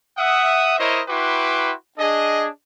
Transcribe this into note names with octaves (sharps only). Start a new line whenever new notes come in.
E5 F#5 D#6
E4 A#4 C5 C#5 D#5
E4 F#4 B4 G5 C6 D6
D4 G#4 D#5